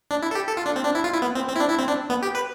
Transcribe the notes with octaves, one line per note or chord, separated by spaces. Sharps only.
D4
E4
A4
G4
A4
F4
D4
C4
D4
E4
F4
E4
B3
C4
C4
E4
D4
E4
C4
D4
B3
G4
B4